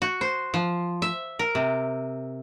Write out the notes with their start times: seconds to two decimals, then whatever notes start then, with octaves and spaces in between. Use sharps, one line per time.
0.02 F#4
0.21 C5
0.54 F3
1.02 E5
1.39 A#4
1.55 C3